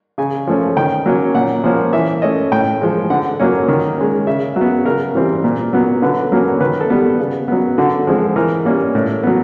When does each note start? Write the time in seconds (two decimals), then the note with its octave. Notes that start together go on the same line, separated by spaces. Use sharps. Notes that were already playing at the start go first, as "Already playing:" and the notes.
0.18 C#3 G#5
0.47 F3 A3 C#4
0.77 D#3 G5
1.06 F#3 A#3 C#4
1.34 A#2 F#5
1.64 F3 A#3 C#4
1.93 E3 E5
2.22 A3 C#4 D#5
2.52 A2 G5
2.81 F3 G#3
3.10 D3 F#5
3.39 F#3 A#3 C#4
3.68 D#3
3.98 G#3 C#4
4.27 C#3 E5
4.56 F#3
4.61 B3
4.85 C#3 A#4
5.15 E3 G3 C4
5.44 A#2
5.73 F#3 B3
6.02 D3 B4
6.32 F#3 A#3 C#4
6.61 D#3 B4
6.81 A4
6.90 G3 B3
7.20 C#3
7.48 F#3 B3
7.78 D3 F#4
8.07 F3 G#3 C4
8.36 E3 A#4
8.65 G3 A#3 C#4
8.95 A2
9.23 F#3 B3